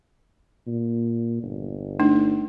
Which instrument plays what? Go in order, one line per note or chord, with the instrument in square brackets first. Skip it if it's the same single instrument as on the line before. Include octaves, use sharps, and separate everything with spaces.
[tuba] A#2
G1
[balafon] A3 D4 D#4